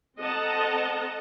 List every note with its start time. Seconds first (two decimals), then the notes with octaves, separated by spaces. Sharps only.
0.20 C4 A4 D#5 F#5 A5 A#5